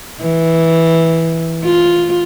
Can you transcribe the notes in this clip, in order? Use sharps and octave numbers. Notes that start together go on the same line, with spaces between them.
E3
F4